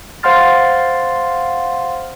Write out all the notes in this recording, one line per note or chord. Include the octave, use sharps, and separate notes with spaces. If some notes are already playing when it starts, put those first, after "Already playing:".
C5 F5 F#5 C6 F6 A6